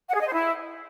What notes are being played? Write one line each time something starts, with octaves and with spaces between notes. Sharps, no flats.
F#5
G#4
D#5
C5
E4